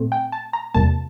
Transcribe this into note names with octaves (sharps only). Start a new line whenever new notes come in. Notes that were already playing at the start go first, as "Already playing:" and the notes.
Already playing: A#2 A3 C4
G5
A5
A#5
E2 C3 G3 A#3 A5